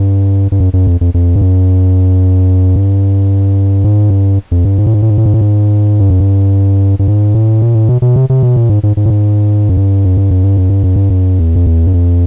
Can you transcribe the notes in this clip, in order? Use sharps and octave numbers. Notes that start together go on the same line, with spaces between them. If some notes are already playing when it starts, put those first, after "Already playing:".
Already playing: G2
G2
F#2
F#2
F2
F2
F2
G2
F#2
G2
G#2
G2
F2
G2
G#2
A2
G#2
A2
G#2
A2
G#2
A2
G#2
G2
F#2
G2
G2
G#2
A2
A#2
A2
B2
B2
C3
C3
B2
A#2
G#2
G#2
G#2
A2
G#2
F#2
G2
F#2
G2
F#2
G2
F#2
G2
F#2
G2
F#2
E2
F2
E2
F#2
F2